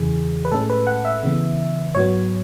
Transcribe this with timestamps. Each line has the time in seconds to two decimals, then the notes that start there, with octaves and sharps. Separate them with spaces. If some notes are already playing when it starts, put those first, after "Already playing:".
Already playing: E2 C#3 E3 G#4
0.45 B4
0.51 A2 G#3 C#4 A4
0.70 B4
0.87 F#5
1.05 E5
1.23 C#3 E3 B3
1.95 G#2 F#3 B3 C#5